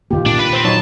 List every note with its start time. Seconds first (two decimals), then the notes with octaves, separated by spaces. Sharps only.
0.11 E1 F#2 D#3 A#3 F4 G4
0.26 A#2 D4
0.39 B4
0.53 C4 C5
0.65 F#3 D#4 C#5 A5